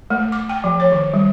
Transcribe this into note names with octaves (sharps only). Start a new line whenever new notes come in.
A3
D6
G5
F3
C#5
D#3
G3